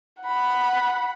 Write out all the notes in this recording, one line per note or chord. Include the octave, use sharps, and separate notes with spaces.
F#5 B5